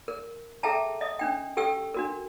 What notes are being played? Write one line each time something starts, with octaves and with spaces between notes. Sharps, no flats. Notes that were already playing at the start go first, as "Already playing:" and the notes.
A#4
G#4 A4 E5 G5 A5 A#5
D#5 D#6
C#4 D4 G5
G4 A4 G5 C#6 E6
D4 F#4 A#4